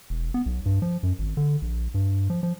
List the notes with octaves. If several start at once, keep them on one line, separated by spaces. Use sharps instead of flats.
E1
B3
B1
G2
F3
F#2
G#1
D3
A#1
G2
F3
F3